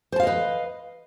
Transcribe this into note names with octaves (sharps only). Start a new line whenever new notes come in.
B4 C5 D#5 F5 A5